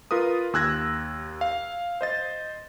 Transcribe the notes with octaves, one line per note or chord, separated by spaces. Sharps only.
F4 A#4 B4 D#6
D#2 E6 F#6 G#6 A#6
F5
C5 D#5 A6